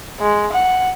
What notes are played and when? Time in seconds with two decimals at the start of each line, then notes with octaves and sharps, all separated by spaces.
0.20 G#3
0.53 F#5